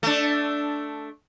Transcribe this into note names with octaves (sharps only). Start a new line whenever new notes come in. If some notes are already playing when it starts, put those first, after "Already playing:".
A3 D4